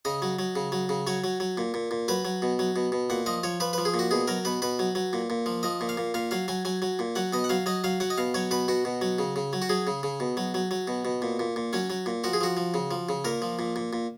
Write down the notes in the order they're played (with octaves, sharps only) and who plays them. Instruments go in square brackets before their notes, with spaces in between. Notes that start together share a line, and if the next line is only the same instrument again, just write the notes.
[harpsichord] C#3 D#5
F#3
F#3
C#3
F#3
C#3
F#3 C#5
F#3
F#3
A#2
A#2
A#2
F#3 B4
F#3
B2
F#3
B2
B2
A#2 F#5
F3 D#5
F3 C#5
F3 B4
F3 B4
G#4
A#2
F#4
B2 G#4
F#3 A#4
B2 B4
B2 B4
F#3
F#3
A#2
A#2
F3
F3 D#5
A#2
F5
A#2
A#2 F5
F#3 F5
F#3 G#5
F#3 G#5
F#3
A#2
F#3 F#5
B2 D#5
F#5
F#3 F5
F#3 D#5
F#3 F5
F#3 F#5
D#5
B2 F5
F#3 C#5
B2 B4
B2 F#4
B2
F#3
C#3
C#3
F#3
F#4
F#3 G#4
C#3
C#3
B2
F#3
F#3
F#3
B2
B2
A#2
A#2
A#2
F#3 C#4
F#3
A#2
F3 F#4
G#4
F3 F#4
F3
C#3
F3
C#3
A#2 A#4
F3
A#2
A#2
A#2